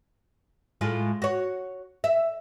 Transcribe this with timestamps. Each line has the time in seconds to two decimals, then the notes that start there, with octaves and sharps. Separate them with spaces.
0.81 A2 G#3 F4
1.22 F#4 C#5
2.04 E5